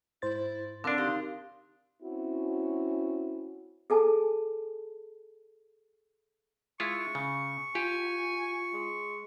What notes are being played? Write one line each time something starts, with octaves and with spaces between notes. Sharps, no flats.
G#2 E4 C5 A6
D3 C4 D4 A#4 F5
D#4 G4 F5 C6
C4 C#4 E4 F#4
G#4 A4 G#5 A5
G#3 E4 F4 C#6
C#3
F4 G4 G#5
G#3